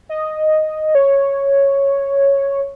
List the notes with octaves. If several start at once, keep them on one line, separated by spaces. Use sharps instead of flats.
D#5
C#5